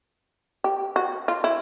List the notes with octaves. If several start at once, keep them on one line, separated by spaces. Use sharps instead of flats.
G4
F#4
F4
E4